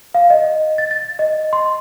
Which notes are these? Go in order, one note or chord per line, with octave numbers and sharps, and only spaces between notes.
F5
D#5
A6
A6
D#5
C6